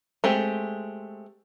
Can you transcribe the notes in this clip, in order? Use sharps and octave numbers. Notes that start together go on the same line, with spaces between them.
G#3 A3 C4 G4